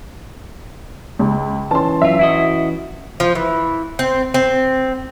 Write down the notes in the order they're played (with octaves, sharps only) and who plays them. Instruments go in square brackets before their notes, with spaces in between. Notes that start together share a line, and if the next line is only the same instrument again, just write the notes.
[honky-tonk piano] C#2
[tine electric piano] E3 C#4 [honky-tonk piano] A5 C6
[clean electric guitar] F#2 F4 [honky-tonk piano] E5
[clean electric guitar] E4 F#4 D#5
[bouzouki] F3
E3
C4
C4